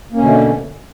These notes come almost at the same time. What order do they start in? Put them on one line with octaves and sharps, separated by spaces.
A#3 C#4 B2 D3 A3